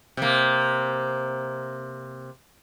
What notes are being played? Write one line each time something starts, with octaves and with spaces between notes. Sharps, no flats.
C3 A#3